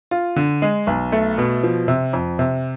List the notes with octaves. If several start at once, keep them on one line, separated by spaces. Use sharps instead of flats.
F4
D3
G#3
B1
A3
B2
F3
C3
F2
C3